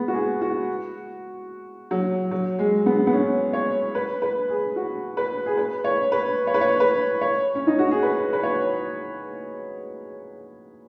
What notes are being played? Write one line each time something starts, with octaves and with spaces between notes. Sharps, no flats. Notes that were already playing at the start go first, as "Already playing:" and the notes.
Already playing: G#3 B3
F#4
G#4
F#4
F#3
F#3
G#3
B3
B3
C#4
C#5
B4
B4
G#4
F#4
B4
G#4
B4
C#5
B4
C#5
B4
C#5
B4
C#5
C#4
D#4
F#4
G#4
B4
B4
C#5